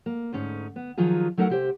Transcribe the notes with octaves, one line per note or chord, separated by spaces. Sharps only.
A#3
D2 G#2 C#4 D#4
B3
D#3 F3 F#3 F4 G#4
F#3 A3 D#4 A#4 D#5 F#5
C3 G4 C5